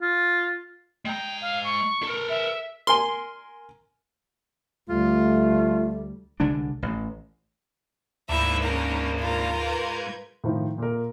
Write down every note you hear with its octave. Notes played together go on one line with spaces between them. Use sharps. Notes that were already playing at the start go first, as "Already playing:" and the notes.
F4
G#3 G5 A#5
F5
C#6
A4 A#4
E5
A#4 G#5 C6
D2 G3 A3 F4
C2 D3 G#3 D4
A1
D2 G#2 A#3 D4 E4 E5
C#4 A#4
F4 A#4
G#2 G#3 B4 G6 G#6
A2 D#3 F3
A#2 A#4